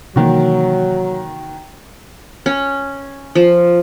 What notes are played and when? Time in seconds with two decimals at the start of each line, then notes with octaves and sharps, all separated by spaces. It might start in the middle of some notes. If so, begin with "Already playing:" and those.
0.16 C3 D#3 E3 F#3 A#3 F#4
2.46 C#4
3.35 F3